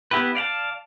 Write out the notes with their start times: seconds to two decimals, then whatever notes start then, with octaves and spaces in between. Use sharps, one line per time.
0.11 B3 E4 G4 B4
0.35 D5 F5 F#5 A5